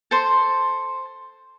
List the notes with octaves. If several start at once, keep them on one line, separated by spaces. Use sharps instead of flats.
A4 C5 C6